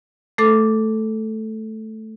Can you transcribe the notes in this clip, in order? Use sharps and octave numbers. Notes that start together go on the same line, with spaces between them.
A3 A4 D6